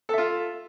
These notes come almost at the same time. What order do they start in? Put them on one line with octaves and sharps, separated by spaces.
A4 E5 F4